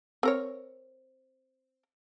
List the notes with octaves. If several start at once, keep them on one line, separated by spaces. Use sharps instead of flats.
C4 A#4 C#5